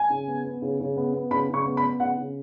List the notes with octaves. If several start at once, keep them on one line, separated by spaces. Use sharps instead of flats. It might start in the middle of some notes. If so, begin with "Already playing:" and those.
Already playing: G#5
C#3
B3
B3
C#3
C#3
B3
B3
C#3 B5
C#3
C#6
B3
B5
B3
C#3 F#5
C#3